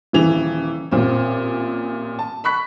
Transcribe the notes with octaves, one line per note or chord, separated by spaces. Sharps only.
D#1 C#3 E3 F7
A1 A#2 C4
A5
B5 C#6 F#6 B6